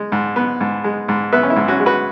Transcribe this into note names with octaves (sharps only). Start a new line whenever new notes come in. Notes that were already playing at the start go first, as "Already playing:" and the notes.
Already playing: G#3
G#2
B3
G#2
G#3
G#2
B3 B4 E5
C#4
E4
G#2
C#4 F#4
G#3
F#4 B4